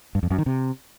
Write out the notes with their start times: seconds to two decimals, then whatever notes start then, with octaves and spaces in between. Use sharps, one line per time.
0.15 G2
0.23 F2
0.31 F#2
0.38 D#3
0.46 C3